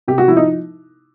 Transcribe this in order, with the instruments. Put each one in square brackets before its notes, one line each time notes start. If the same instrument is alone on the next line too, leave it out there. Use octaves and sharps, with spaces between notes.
[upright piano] C3 G4
F#4
F3 E4
D#4